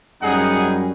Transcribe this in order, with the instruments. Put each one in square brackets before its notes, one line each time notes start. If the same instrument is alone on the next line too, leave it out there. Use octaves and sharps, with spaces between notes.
[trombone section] F#2 G3 C#4 [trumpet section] D#4 G#4 F#5